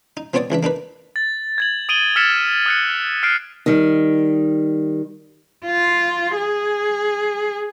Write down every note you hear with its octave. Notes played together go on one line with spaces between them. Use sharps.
D#4
F3 B3 C4 C#5 D5 D#6
C#2 E3 D4 E5
A#3 D4 D#4 B4
A6
G#6 A6 F#7
D#6 D7 D#7 F#7 G7
E6 F6 A6 B6 C#7 E7
D#6 F#6 C#7
F6 F#6 C7 D7
D#3 G3
F4
G#4